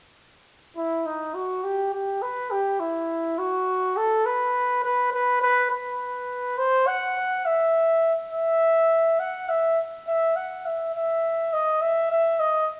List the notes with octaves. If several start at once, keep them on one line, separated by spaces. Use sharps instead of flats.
E4
D#4
F#4
G4
G4
B4
G4
E4
F#4
A4
B4
B4
B4
B4
B4
C5
F#5
E5
E5
F#5
E5
E5
F#5
E5
E5
D#5
E5
E5
D#5